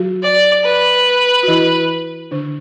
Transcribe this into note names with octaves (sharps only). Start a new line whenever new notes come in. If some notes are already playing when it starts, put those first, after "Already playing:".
Already playing: F#3 F#4
D5
B4
F#4
E3 E4
D3 D4